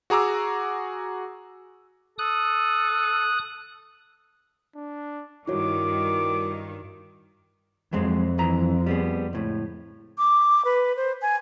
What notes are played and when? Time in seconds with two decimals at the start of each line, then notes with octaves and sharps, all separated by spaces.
0.10 F#4 G#4 A#5 D6 E6
2.19 A4 D#6 F#6
4.75 D4
5.48 G2 D#3 E4 F#4 C#5 D6
7.93 F2 F#3 G#3 C4
8.38 G2 E3 A#5
8.86 G3 B3 G#4
9.33 C#2 A2
10.18 D6
10.65 B4
10.97 C5
11.22 G#5